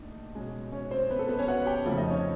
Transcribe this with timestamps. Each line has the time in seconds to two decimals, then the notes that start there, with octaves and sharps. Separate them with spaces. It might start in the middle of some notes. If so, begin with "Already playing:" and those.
Already playing: A2 A#3 D4 D#4
0.35 B2 G#3 C#4
0.72 C#4 C#5
0.91 C4 C5
1.11 B3 B4
1.19 A4
1.28 B3 B4
1.38 C#4 C#5
1.47 F#4 F#5
1.66 G4 G5
1.86 F2 C#3 F3 A3 C4
1.97 D#4 D#5
2.09 C#4 C#5